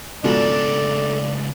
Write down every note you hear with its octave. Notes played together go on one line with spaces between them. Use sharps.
C#2 G#2 B2 F3 D4 A4 D5